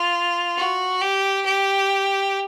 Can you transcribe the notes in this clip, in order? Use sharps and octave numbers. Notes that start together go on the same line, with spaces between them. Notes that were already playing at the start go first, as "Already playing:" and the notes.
Already playing: F4
F#4
G4
G4